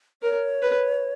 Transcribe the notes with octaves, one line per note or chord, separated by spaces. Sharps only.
A#4 C#5
B4